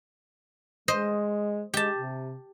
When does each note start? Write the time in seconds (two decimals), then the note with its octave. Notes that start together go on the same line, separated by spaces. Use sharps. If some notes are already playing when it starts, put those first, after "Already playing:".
0.88 G#3 C5 D#5
1.74 G#3 G4 A5
1.95 C3